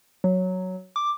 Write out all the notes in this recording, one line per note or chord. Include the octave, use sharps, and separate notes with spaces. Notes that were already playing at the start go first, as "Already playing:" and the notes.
F#3
D6